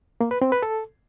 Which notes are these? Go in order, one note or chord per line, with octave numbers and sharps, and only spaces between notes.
A#3
B4
C4
B4
A4